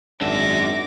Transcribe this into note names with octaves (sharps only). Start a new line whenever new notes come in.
G#1 F#2 D4 E5 D6 A#6